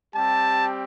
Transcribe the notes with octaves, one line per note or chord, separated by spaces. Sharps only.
G3 C4 G4 A5